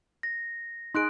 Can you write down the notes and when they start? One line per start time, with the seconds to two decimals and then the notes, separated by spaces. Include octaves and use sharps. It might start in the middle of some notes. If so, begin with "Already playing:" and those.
0.23 A#6
0.95 D#4 G#4 C6 F#6 D7